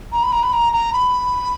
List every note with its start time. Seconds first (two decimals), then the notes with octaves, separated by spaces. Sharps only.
0.12 A#5
0.23 B5
0.32 A#5
0.43 B5
0.53 A#5
0.73 A#5
0.93 B5